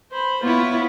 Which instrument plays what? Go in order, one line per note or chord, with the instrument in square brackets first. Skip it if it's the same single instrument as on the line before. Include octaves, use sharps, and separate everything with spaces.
[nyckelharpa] C5 B5
[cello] B3 E4 [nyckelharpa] F4 C#5